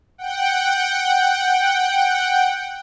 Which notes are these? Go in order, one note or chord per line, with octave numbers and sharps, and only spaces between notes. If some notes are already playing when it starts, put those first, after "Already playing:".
F#5 G5